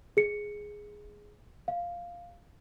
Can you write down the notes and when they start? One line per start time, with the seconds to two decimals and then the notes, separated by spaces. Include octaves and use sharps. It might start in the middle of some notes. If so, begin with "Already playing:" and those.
0.17 G#4 C#7
1.68 F5